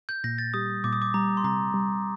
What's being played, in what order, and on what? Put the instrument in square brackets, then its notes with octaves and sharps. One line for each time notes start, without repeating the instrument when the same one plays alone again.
[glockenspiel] G6
[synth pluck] A#2 [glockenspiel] A#6
[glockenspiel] A6
[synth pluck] G3 [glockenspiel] D#6
[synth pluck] A#2 [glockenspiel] D6
[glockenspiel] D#6
D6
[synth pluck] G3 [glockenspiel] A#5
[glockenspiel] C6
[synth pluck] C3 [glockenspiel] A#5
[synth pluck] G3